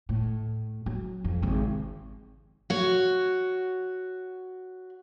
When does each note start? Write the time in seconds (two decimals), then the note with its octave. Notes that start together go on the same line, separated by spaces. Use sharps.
0.09 A2
0.86 F#3
1.24 F2
1.42 G#1 C3
2.70 F#4 C#5